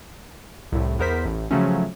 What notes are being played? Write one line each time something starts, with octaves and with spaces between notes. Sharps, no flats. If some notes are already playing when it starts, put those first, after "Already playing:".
C2 A2
E2 B3 A#4 C5 B6
A1
C#3 F3 F#3 A3 C#4